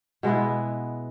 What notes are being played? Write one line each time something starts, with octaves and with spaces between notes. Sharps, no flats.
B2 G#3 B3 E4